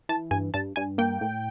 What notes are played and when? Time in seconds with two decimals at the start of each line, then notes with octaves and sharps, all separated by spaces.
0.09 E3 A5
0.31 G2 G#5
0.54 G2 A5
0.76 G2 G#5
0.98 A#3 G5
1.21 A2